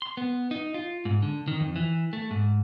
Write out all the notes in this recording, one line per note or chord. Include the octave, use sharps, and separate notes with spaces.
C6
B3
D#4
F4
G#2
D3
D#3
F2
E3
A3
G#2